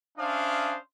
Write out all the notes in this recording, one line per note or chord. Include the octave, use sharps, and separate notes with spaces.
C#4 D4 C5 E5 F5 D#6